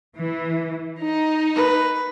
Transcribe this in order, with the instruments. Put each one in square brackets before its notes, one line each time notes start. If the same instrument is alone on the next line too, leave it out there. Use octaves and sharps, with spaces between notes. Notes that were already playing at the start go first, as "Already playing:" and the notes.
[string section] E3
D#4
[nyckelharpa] B4